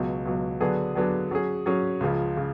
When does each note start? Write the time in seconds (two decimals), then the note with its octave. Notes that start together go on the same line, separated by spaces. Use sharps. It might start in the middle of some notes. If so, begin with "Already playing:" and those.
Already playing: C#2 B2 F#3
0.25 C#2 B2 F#3
0.60 D3 F#3 B3 D4 G#4
0.95 D3 F#3 B3 D4 G#4
1.31 F#3 C#4 G#4
1.66 F#3 C#4 G#4
2.00 C#2 C#3 F3
2.37 C#3 F3